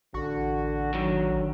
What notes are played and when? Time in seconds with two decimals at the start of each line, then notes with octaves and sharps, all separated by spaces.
0.14 A1 D3 F#4
0.94 D3 D#3 F#3